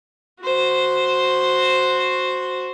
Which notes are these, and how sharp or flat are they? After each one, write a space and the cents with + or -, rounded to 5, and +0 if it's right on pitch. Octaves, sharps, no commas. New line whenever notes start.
F#4 -5 C5 +0